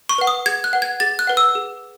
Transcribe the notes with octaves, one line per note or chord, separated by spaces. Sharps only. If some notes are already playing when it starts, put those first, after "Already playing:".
C#6
B4 F#5
D#6
G#4 G#6
F#6
B4 F#5
G#6
G#4 A6
F#6
B4 F#5
E6
G#4